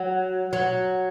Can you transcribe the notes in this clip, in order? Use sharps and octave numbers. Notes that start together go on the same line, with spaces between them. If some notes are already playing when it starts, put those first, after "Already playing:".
Already playing: F#3
F#3